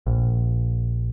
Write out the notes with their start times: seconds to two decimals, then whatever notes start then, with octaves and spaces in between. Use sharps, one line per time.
0.07 A#1